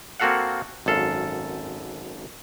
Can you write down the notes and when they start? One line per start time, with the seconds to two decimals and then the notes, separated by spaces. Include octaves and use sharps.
0.20 A#3 C4 F#4 A4 F5 F#5
0.86 G#1 F#2 A4 F5